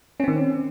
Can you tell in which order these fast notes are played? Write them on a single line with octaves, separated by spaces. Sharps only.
C#4 C4 D#3